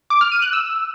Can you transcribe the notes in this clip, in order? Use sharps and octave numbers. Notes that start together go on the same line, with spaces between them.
D6
F6
D#7
F#6
E6